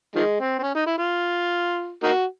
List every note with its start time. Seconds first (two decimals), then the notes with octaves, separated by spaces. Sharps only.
0.16 D#3 F3 G#3
0.40 C4
0.59 C4
0.62 C#4
0.75 D#4
0.86 E4
0.98 F4
2.03 A#3 D#4 F#4